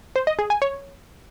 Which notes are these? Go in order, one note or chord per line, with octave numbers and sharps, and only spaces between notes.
C5
D#5
G#4
G#5
C#5